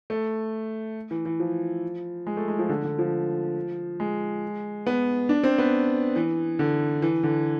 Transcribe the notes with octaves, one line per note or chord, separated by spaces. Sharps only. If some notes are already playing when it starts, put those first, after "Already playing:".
A3
E3
E3
F3
G#3
A3
G#3
F3
D3
D3
F3
G#3
B3
D4
C4
B3
E3
D3
E3
D3